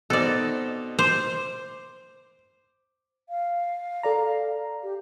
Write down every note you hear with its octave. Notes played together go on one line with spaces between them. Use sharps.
B2 C4 D#4 A4 D5
C5 D6
F5
A4 D5 A#5
G4